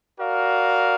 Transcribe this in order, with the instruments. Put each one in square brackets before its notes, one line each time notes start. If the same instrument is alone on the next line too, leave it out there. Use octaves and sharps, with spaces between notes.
[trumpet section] F#4 A#4 D5 F5